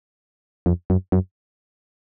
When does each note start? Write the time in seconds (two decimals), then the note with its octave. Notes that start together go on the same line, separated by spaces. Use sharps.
0.66 F2
0.90 F#2
1.12 F#2